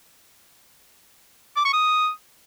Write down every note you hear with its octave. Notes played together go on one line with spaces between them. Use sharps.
D6
C#6
D#6